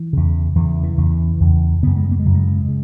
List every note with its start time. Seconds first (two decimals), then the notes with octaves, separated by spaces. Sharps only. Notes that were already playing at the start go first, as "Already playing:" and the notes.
Already playing: E3
0.13 E2 C#3
0.55 E2 C#3 E3
0.83 E3
0.98 E2 C#3
1.40 E2 C#3
1.82 F#2 C#3 B3
1.96 G#3
2.12 A#3
2.19 G#3
2.25 F#2 C#3 F#3
2.34 G#3
2.68 C#3